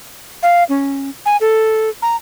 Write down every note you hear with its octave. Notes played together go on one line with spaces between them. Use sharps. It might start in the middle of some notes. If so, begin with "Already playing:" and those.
F5
C#4
G#5
A4
A#5